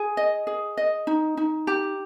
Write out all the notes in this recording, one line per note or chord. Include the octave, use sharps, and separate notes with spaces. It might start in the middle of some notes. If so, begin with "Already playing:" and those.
Already playing: G#4
D#5
G#4
D#5
D#4
D#4
G4